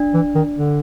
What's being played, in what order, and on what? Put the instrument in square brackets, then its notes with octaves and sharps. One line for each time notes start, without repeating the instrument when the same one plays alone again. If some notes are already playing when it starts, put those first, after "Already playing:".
Already playing: [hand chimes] D4
[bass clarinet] E3
D#3
D3